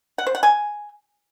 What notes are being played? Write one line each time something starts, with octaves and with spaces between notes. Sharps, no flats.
F#5
C5
F#5
G#5